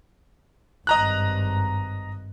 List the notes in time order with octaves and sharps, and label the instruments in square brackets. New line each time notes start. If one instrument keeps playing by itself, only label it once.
[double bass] G#1 G2 [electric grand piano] D#5 A#5 F#6